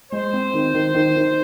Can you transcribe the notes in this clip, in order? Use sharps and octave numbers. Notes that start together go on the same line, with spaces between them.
G#3 C5
C4
D#3
D#3
D#3
D#3